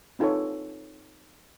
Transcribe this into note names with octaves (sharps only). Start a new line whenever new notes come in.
C4 D#4 F4 A4 B4 C#5